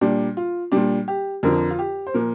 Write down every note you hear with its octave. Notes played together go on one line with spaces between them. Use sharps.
A#2 G3 D4
F4
A#2 G3 D4
G4
F2 D3 F3 A#4
F4
G4
C5
A#2 F3 A#4